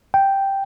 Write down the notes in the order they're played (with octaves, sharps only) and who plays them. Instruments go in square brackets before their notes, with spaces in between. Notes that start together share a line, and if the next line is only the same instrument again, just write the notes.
[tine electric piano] G5